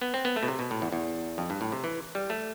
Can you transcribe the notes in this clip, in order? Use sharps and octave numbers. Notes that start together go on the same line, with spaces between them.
B3
C4
B3
A3
B2
C3
B2
A2
E2
E2
F2
G2
A2
C3
E3
G3
A3